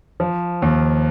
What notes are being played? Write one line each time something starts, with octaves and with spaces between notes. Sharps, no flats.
F3
D#2